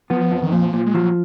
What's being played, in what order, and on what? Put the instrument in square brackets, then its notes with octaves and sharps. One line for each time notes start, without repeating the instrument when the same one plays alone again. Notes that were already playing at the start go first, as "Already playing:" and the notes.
[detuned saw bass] F3 [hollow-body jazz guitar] B3
[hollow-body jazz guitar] F2
[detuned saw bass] D#3
[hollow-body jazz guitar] A#2 [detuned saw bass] F3
[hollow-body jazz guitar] A#2
[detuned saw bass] G#3
[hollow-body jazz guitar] F3 [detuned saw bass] F#3